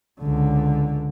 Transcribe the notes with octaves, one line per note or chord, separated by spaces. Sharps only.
C#2 D3